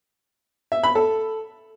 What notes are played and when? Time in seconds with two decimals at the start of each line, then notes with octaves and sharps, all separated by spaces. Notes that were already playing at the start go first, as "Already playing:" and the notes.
0.72 E5
0.83 B5
0.95 A4